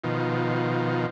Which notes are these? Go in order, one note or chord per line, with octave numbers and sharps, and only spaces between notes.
B2 D#3 F3